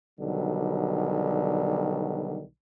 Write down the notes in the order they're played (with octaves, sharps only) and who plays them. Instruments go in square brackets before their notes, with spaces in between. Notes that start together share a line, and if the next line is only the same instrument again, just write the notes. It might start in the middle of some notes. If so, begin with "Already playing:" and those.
[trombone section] B1 D3 D#3 F#3 G3